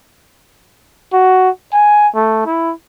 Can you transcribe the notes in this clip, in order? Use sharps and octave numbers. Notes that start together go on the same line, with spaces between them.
F#4
G#5
A3
E4